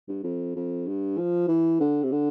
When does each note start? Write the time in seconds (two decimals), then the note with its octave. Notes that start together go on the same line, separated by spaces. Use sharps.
0.08 G2
0.23 F2
0.56 F2
0.87 G2
1.18 F3
1.48 E3
1.80 D3
2.03 C3
2.12 D3